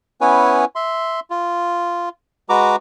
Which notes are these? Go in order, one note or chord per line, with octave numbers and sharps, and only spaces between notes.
B3 C#4 E4 B4 C#5 G#5
E5 C6
F4
G#3 F#4 B4 A#5 D6